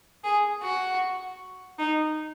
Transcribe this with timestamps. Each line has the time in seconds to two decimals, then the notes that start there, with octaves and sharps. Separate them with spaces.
0.23 G#4
0.61 F#4
1.78 D#4